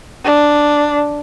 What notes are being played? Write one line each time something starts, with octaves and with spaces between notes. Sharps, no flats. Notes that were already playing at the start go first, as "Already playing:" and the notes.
D4